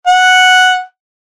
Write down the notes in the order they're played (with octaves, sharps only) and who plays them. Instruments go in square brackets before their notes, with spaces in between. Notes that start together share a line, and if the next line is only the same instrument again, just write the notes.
[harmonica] F#5